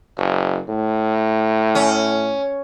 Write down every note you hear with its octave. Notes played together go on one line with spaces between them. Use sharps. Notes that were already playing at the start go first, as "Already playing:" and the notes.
F#1
A2
C#4